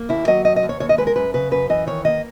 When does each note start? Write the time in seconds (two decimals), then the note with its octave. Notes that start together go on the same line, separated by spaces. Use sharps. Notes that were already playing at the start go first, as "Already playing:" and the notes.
Already playing: A#3
0.09 D#2 E4
0.27 F#3 D#5
0.45 D#2 D#5
0.56 D#5
0.63 D#2
0.69 C#5
0.80 D#2 C#5
0.89 D#5
0.98 G#3 B4
1.07 A#4
1.16 F#2 B4
1.34 C#3 B4
1.51 F#2 B4
1.70 E3 D#5
1.87 D#3 C#5
2.05 A#3 D#5